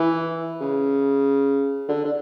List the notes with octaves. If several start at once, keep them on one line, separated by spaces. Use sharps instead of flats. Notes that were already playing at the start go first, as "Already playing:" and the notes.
Already playing: E3
C#3
D3
D3